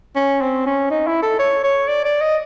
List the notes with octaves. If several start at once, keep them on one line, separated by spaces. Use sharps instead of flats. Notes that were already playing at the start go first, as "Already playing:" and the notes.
C#4
C4
C#4
D#4
E4
A4
C#5
C#5
D5
D5
D#5